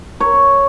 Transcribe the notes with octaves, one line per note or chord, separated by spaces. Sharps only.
C#5